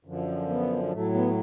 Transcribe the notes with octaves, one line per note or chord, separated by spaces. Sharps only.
F#2 D3 F3
B3
A2 F#3 A3
B3